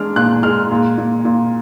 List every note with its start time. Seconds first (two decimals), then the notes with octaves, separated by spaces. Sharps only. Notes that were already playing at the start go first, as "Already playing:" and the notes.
Already playing: G#3 D4 F6
0.16 A#2 F#6
0.43 G#3 F6
0.71 A#2
0.98 A#2
1.25 A#2